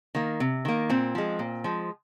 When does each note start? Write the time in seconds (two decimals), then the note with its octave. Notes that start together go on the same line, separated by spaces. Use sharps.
0.15 D#3 A#3
0.40 C3
0.65 D#3 A#3
0.89 A#2 C4
1.15 F3 G#3
1.39 A#2
1.64 F3 G#3